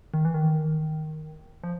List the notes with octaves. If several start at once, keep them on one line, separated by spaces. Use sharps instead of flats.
D#3
E3
D#3
F3